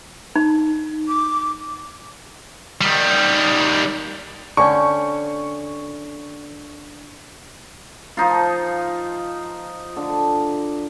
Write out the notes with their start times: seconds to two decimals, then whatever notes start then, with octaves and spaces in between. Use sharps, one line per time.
0.36 D#4
1.08 D6
2.81 D#3 G3
4.57 D3 C#4 G5 C#6
8.17 F3 D#4 F4
9.96 D3